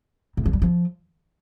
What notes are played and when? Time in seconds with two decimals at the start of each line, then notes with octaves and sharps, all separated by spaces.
0.37 A2
0.46 F3
0.53 G3
0.62 F3